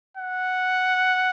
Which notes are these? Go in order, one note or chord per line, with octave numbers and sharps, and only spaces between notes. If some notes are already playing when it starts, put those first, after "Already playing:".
F#5